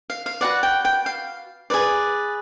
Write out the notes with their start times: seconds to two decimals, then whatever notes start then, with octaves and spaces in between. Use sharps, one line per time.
0.10 F5
0.26 F5
0.41 F#4 B4 D5 F#5
0.63 G5
0.85 G5
1.06 F5
1.70 G#4 B4 D5